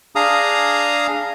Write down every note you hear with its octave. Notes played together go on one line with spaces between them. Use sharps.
D4 G#4 F5 A#5 D#6